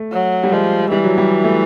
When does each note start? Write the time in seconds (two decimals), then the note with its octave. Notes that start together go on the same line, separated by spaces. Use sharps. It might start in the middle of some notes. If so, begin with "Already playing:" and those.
Already playing: A3
0.13 F#3
0.44 G3
0.52 F3 G#3
0.91 E3 G3
1.04 F#3
1.18 G3
1.44 A3